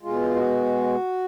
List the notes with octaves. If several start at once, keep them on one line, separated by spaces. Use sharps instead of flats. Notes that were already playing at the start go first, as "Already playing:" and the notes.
B2 G#3 F4
F#4